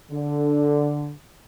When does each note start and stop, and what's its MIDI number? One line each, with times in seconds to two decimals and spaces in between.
0.12 1.12 50